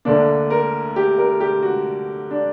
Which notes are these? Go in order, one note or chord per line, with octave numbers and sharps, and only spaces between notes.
D2 D3 A#3 D4
A#4
G4
A#4
G4
F#4
D4